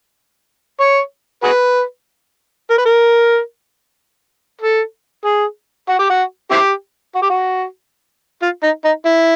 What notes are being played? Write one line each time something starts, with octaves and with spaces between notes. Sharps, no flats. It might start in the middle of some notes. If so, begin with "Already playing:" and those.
C#5
F#4 G#4 B4
A#4
B4
A#4
A4
G#4
F#4
G4
F#4
C4 E4 G4
F#4
G4
F#4
F4
D#4
D#4
E4